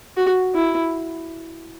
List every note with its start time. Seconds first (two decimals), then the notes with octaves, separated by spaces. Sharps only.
0.17 F#4
0.54 E4